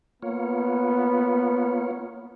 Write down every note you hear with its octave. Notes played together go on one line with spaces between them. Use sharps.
A#3 B3 F4 C#5